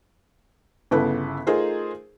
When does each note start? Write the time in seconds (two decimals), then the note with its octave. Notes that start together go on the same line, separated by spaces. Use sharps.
0.91 G1 C#3 B3 E4 A4 B4
1.47 A3 D#4 F4 G#4 A#4 C5